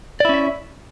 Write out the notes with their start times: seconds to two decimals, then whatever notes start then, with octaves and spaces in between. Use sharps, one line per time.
0.20 D5
0.25 E4
0.29 C#4
0.34 E5